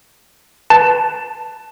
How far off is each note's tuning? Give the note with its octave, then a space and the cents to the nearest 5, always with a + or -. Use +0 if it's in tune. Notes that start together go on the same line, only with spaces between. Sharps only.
B4 +0 A5 +0